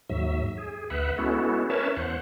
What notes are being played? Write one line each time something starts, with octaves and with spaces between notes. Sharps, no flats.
D#2 G#2 F#3 E5
G#4
D2 B4 E5 F#5
G#3 B3 C#4 E4 F#4 A4
C#4 A#4 B4 C#5 E5 A5
E2 C5 F#5